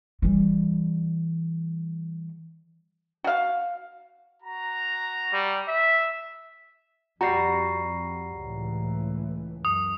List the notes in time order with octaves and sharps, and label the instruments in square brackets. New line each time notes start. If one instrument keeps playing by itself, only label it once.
[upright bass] E3 G3
[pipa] F#4 F5
[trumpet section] F#4 A#5
[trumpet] G3
E5
[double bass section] F2 [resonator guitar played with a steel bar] G3 F#4 [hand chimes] A#5 C7
[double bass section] C#2 A2 E3
[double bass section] F#2 [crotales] D#6